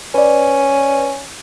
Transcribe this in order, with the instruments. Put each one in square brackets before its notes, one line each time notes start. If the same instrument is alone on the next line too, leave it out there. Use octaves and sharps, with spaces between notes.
[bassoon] C#4 [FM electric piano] B4 D5